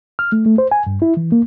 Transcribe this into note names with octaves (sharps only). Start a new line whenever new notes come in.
F6
A3
A3
C5
G#5
G2
E4
E3
A#3